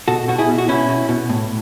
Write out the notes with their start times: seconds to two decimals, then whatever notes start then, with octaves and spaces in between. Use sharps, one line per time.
0.08 B2 F#4 A4
0.28 B2 F#4
0.38 E4 G#4
0.49 B2
0.58 F#4
0.69 B2 C#4 E4
0.89 B2
1.09 B2
1.29 A2